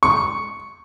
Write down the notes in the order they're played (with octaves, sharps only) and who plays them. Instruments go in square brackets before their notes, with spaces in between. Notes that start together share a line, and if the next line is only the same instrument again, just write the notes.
[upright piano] C#6